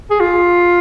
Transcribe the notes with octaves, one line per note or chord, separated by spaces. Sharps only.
G#4
F4